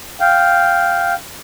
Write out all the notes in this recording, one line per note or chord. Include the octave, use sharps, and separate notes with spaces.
F5 G5